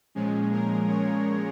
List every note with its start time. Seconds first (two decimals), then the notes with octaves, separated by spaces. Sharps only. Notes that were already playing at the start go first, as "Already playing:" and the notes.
0.15 A#2 F3 G#3 C#4 G#4
0.52 A#4
0.88 C#5